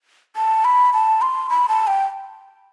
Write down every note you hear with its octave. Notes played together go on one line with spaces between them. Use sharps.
A5
B5
A5
C6
B5
A5
G5